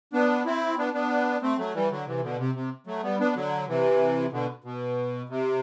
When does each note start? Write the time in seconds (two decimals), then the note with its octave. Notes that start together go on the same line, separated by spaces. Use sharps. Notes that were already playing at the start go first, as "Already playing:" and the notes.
0.13 B3 D4
0.46 C4 E4
0.78 B3 D4
0.94 B3 D4
1.42 A3 C4
1.58 F#3 A3
1.74 E3 G3
1.91 D3 F#3
2.06 C3 E3
2.22 B2 D3
2.38 C3
2.55 C3
2.87 F#3 A3
3.03 G3 B3
3.20 B3 D4
3.36 D3 F#3
3.68 C3 E3
4.32 B2 D3
4.64 B2
5.29 C3